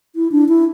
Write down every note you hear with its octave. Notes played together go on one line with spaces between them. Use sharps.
E4
D4
E4